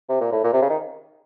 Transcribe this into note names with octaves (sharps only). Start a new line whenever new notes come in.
C3
A#2
A2
A#2
C3
C#3
D#3